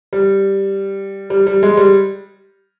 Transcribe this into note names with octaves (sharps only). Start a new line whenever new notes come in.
G3
G3
G3
G#3
G3